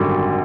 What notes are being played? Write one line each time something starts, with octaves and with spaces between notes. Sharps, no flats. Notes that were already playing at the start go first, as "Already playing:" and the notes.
Already playing: G#1 F#2 D3 G3